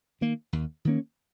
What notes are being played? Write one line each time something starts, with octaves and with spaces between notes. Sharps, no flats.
D#3 A#3
D#2
D#3 A#3 C#4